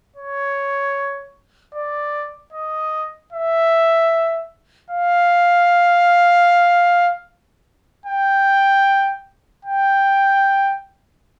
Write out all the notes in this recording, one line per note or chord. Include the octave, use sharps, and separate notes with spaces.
C#5
D5
D#5
E5
F5
G5
G5